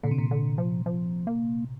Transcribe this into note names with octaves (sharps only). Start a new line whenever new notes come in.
A#2 D3
C3
A#2
D3
F3
F3
A#3